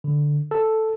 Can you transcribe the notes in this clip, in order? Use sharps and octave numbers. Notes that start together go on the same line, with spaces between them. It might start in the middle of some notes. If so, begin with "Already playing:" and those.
D3
A4